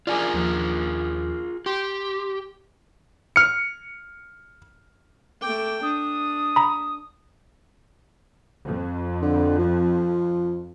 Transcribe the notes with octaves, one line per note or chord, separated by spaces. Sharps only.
F4 G#4 A#4 D5 G#5 D6
D#2 F3
G4 C6
F6 C#7
A3 G5 D6
D4 D#6
A#5 B5
F2
D3
F3